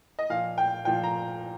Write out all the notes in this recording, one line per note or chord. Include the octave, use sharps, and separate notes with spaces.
D#5
A#2 F3 F5
G5
A#2 F3 G5
A#5